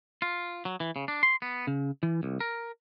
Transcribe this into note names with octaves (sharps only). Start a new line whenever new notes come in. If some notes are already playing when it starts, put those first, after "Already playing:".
F4
F#3
E3
C#3
D4
C6
B3
C#3
E3
C2
A#4